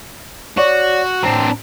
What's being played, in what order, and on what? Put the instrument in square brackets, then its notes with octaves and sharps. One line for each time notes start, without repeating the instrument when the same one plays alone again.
[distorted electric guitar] F#4 [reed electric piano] C#5 D5
[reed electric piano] A2 A#5 [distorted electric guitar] C4 D4